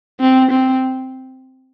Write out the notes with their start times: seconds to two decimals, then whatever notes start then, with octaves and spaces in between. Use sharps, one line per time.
0.20 C4
0.51 C4